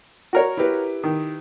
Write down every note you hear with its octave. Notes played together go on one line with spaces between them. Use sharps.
F#4 A#4 C#5
E4 G4 B4
D#3